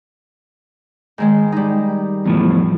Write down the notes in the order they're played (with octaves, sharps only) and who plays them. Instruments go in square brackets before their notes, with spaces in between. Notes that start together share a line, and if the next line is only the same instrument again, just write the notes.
[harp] G#2 D#3 G#3
G3 D#4
[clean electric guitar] E2 A2 F3